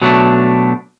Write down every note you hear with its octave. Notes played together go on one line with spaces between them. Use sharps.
B2 F#3 A3 D4